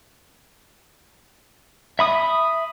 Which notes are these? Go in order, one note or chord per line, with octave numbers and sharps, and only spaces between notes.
E5 B5 D#6